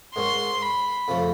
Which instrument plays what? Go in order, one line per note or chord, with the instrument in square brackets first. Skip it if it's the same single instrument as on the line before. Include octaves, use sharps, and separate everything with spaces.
[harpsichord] G#2 D#3 G#3 C#4 [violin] C6
[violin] B5
[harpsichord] F2 C#3 F3 A3